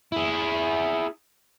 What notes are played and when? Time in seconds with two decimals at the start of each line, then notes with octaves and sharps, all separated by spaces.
0.12 E4 G#4